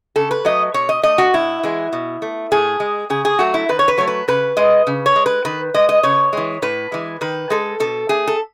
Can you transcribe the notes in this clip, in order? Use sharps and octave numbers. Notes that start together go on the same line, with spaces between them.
C#3 A4
B4
F#3 A3 D#5
B2 C#5
D#5
A3 D#5
F#4
A2 E4
E3 G#3
B2
A3
A2 G#4
G#3
C#3 G#4
G#4
F#3 A3 F#4
E4
D#3 B4
C#5
B4
F#3 A3 C#5
B4
C#3 B4
G#3 D#5
C#3
C#5
G#3
B4
D#3 B4
G#3 D#5
D#5
C#3 C#5
E3 G#3
A2 B4
E3 G#3
D#3 B4
G#3 A4
B2 A4
A3 G#4
A4